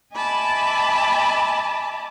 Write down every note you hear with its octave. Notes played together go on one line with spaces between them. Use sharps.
D#5 E5 G#5 A5 B5 D6